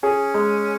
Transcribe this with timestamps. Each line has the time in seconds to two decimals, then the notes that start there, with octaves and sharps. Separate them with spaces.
0.03 C#4 G#4
0.34 G#3